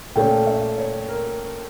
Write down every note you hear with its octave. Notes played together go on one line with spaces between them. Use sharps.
A#2 A3 C#4 G5
E5
C#5
A#4